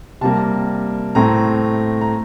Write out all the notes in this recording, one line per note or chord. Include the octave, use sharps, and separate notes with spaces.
C3 G3 A#3 A5
A2 A3 C4 A#5
A#5